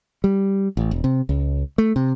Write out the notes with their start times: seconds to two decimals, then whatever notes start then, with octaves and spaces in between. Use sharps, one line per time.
0.24 G3
0.77 A1
0.91 E1
1.04 C3
1.29 C#2
1.78 A3
1.96 C3